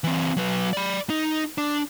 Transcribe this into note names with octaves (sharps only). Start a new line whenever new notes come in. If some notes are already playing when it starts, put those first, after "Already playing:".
E3 C4
F#3 B4
D5 B5
D#4
D4